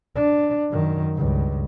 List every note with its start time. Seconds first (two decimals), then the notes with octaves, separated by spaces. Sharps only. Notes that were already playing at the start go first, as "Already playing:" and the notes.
0.16 D4
0.71 F#2 D#3
1.15 C#2 G2